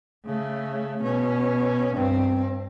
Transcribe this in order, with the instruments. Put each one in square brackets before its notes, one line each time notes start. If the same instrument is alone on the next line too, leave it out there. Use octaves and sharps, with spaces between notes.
[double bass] C#3 A3
B2 C#4
G2 C4